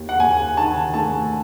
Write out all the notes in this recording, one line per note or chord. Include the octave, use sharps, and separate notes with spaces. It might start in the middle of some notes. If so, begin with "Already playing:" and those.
Already playing: D#2
F#5
D#2 G#5
D#3 A5
A3 A5